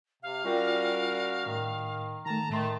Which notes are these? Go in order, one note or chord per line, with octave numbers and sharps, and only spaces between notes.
C3 F5
G3 C#4 F4 F#4 A#4 D5 G5
A2 D#3
D#3 A3 A5 A#5
A2 D#3 A3 C6